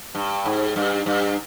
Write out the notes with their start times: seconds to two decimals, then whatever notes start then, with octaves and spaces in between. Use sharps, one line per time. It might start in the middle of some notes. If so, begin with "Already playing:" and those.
0.15 G2
0.45 G#2
0.76 G2
1.06 G2